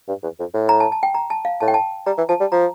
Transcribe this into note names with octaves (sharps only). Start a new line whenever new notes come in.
G2
E2
F2
A2
A#5
A5
A5
G5
A#5
A5
F5
A2 A5
G5
A5
G3 A#5
E3
F3 A5
G3
F3 A#5